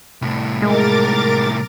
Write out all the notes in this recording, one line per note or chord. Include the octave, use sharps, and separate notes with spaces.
C2 A2
G#3 A#4 D6 A6